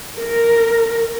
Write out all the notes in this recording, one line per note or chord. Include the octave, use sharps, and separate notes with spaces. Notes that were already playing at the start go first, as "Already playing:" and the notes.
A#4